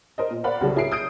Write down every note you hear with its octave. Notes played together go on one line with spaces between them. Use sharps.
A#4 C5 D#5
A#2
A#4 C5 D5 F5 F#5 B5
C2 C#3 F#3 A4
F#3 E4 G#4 A#4 C7 D7
D#6 G6 D7